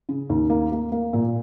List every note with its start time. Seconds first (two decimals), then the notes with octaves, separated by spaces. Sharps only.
0.09 C#3
0.29 D#2
0.50 A#3
0.72 A#3
0.92 A#3
1.13 A#2